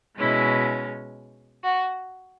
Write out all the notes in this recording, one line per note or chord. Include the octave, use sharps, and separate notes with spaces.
B2 G#3 C#4 E4
F#4